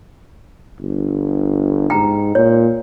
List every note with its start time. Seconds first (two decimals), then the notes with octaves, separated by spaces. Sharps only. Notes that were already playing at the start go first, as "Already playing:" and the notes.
0.81 G1
1.90 G#2 G5 A#5
2.35 A#2 C#5